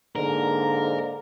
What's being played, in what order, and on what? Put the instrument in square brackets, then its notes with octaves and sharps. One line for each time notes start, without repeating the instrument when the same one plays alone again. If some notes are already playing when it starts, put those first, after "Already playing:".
[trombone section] G#2 D3 A#3 [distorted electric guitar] A#4